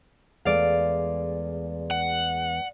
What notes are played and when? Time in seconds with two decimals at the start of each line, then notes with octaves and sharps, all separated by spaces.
0.45 E2 G#3 A3 D5 F5
1.91 F#5